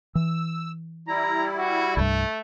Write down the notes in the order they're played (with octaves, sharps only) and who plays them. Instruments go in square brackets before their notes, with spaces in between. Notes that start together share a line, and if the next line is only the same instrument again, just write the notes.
[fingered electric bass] E3 [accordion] E6
[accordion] G3 E4 [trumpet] A#5
[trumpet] F#4
[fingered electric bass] C2 G2 [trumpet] A3